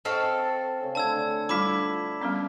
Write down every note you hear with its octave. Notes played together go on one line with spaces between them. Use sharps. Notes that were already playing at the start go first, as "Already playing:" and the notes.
C4 A4 D#5 F5 C#6
C#3 C#4
D3 A3 A5 E6 G#6
G3 D4 E4 F4 D6 B6
G3 B3 C#4